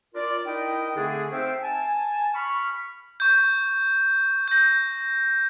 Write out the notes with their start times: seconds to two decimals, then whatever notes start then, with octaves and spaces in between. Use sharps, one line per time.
0.15 F4 A#4 D5
0.46 D#4 E4 A#4 D#5 G5
0.96 D3 A3 C4 D4 G#4
1.32 C4 D#4 C5 E5 F5 G5
1.63 G#5 A5
2.35 B5 C#6 F6
3.20 C#6 G6
4.48 G6 A#6